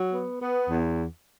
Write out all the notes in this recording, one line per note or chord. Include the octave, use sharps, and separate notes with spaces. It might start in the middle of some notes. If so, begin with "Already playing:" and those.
Already playing: F#3
B3
B3
E2